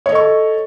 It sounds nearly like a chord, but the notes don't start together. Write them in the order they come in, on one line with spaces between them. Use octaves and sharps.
C#5 D#5 A4 C#6